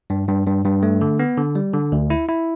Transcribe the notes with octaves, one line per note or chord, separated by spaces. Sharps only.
G2
G2
G2
G2
A3
D3
B3
D3
G3
D3
D2
E4
E4